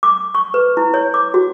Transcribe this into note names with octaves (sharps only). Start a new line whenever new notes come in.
D6
C#6
B4
E4
C#5
D6
F#4